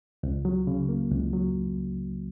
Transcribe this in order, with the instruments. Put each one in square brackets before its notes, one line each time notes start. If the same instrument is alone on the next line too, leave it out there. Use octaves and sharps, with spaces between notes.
[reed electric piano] C#2
F#3
C#3
A#3
C#2
F#3